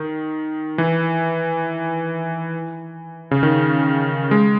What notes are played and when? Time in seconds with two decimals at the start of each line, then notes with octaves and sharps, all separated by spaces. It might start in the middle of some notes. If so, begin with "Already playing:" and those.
Already playing: D#3
0.78 E3
3.31 C#3
3.43 D#3
4.31 G#3